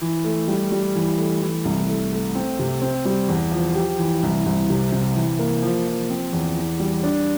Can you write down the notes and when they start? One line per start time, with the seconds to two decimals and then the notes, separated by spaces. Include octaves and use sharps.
0.01 E3
0.24 A3
0.48 G3
0.72 G3
0.95 E3
1.18 A3
1.42 E3
1.65 C2
1.89 A3
2.13 A3
2.35 C4
2.59 C3
2.82 C4
3.05 G3
3.28 E2
3.52 F3
3.75 G4
3.99 E3
4.23 C2
4.46 C2
4.70 C3
4.92 C3
5.16 E3
5.39 A#3
5.62 F3
5.87 F3
6.10 C4
6.33 E2
6.56 E3
6.80 G3
7.04 D4